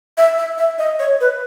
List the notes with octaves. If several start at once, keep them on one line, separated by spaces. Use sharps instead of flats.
E5
E5
E5
D#5
C#5
B4